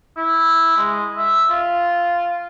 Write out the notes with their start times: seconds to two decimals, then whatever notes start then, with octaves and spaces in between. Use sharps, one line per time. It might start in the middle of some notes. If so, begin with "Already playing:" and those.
0.17 E4
0.77 G#3
1.18 E5
1.49 F4